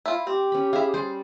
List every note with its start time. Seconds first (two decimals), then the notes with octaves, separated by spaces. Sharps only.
0.06 E4 F4
0.27 C4 G4
0.52 C#4 B5
0.73 E4 G#4 F5
0.94 G3 C5